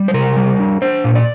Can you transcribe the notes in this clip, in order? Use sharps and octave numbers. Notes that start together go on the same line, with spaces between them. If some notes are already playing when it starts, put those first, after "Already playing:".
Already playing: G3
C5
C3 A#4
G3
D4
D4 C5
A#2
D5